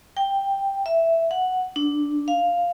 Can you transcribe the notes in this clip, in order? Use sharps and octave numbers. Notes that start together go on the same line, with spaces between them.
G5
E5
F#5
D4
F5